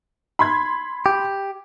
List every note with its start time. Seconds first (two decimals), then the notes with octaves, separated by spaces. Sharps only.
0.39 B5 C6 G#6
1.06 G4